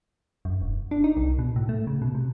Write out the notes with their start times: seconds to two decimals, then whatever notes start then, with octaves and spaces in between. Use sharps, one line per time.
0.45 F#2
0.61 E1
0.91 D4
1.04 D#4
1.17 C2
1.39 B2
1.56 A2
1.69 A3
1.87 C#3
2.02 B2
2.15 C3